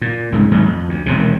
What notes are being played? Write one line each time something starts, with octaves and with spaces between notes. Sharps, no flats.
A#2
C2 G#2 C#3
D#1 G#2 F#3 A3
F2
D2
E1 D#2 C3